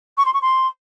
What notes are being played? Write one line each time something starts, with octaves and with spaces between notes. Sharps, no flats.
C#6
C6
C#6
C6